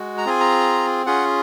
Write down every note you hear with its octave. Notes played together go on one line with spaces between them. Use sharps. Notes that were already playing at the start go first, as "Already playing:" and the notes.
Already playing: G#3 F#4
A#5
C4 F4 G#4 G#5
A#5
C#4 F4 G#4 F#5